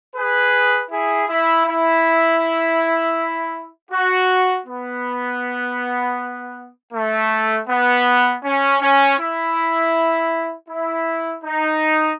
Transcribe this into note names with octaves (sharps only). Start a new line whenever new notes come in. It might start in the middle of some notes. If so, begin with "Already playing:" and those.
G#4 B4
E4 G#4
E4
E4
F#4
B3
A3
B3
C#4
C#4
E4
E4
D#4